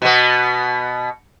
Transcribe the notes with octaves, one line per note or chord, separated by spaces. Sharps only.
B2 B3